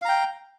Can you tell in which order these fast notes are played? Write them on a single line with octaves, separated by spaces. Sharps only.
F5 A#5 G5